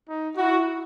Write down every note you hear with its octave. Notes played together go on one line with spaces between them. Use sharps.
D#4
E4 F#4